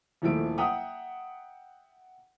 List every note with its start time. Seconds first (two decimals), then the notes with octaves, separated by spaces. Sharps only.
0.22 D#1 D#3 F3 A3 E4 D7
0.58 E5 F#5 G5 A#5 D#6